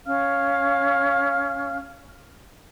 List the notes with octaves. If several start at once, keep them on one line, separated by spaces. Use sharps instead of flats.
C#4 F5 F6